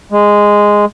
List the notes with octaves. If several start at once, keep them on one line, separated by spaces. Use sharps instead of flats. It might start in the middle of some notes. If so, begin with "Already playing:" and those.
G#3